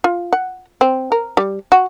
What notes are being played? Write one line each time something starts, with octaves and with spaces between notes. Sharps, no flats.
F4
F#5
C4
A#4
G3
F#4